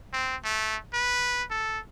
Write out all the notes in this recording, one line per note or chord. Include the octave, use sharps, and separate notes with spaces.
C4
A3
B4
A4